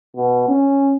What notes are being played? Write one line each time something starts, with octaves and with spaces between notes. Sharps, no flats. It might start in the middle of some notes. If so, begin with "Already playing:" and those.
B2
C#4